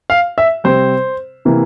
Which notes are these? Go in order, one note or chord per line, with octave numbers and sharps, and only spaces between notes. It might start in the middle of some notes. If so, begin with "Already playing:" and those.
F5
E5
C3 G3 C4 C5
C3 E3 A#3